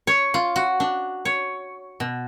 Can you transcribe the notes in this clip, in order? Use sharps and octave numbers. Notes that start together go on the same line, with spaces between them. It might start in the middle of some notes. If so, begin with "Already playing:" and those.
C#5
F4
F#4
D4
C#5
B2